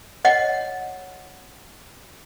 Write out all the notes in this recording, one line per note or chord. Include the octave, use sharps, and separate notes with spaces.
C#5 D#5 F#5